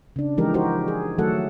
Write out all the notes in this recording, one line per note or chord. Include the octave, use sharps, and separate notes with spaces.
C#3 D4
E3 F3 G#3 D#4 G4 A#4
D#4 F#4 G4 A#4 C5
G#4
D#3 F#3 A3 F#4 A4 F#5